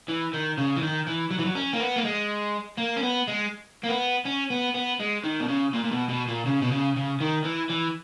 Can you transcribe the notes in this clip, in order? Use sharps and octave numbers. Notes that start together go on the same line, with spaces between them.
E3
D#3
C#3
E3
D#3
E3
F#3
E3
F#3
C#4
A#3
B3
A#3
G#3
A#3
C#4
B3
G#3
A#3
B3
C#4
B3
B3
G#3
D#3
B2
C#3
A#2
A#2
B2
B2
A#2
C#3
B2
C#3
C#3
D#3
E3
E3